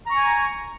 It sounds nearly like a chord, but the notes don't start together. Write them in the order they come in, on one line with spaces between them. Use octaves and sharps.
A#5 C#6 G#5